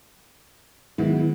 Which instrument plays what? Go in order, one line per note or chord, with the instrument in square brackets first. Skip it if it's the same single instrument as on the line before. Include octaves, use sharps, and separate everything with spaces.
[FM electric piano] D#3 G#3 B3 [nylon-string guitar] F#3 E4